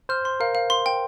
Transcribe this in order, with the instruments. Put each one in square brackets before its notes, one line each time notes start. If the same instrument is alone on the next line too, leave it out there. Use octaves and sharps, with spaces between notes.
[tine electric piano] C5 [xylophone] F6
[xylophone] C6
[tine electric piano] A#4 [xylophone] F5
[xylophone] F5
C6
G5